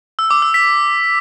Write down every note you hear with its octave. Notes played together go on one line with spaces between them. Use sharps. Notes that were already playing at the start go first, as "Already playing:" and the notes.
E6
D6
E6
B6